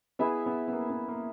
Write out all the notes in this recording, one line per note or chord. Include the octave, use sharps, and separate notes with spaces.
B3 E4 G#4 B4 E5
B3
B3
A#3
B3
A#3